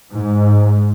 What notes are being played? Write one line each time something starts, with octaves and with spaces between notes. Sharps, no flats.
G#2